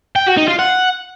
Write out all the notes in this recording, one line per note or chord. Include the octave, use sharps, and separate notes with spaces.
G5
F#4
D#4
F4
F#5